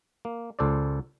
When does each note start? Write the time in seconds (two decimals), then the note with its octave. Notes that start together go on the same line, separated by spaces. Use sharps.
0.25 A#3
0.59 C#2 A4 C5 D5